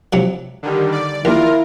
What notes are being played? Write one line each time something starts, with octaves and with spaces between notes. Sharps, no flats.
C3 F3 F#3
D3 D#3 G3
D5
D#2 E4 F4 A#4